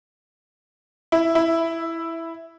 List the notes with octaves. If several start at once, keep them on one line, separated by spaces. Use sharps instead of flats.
E4
E4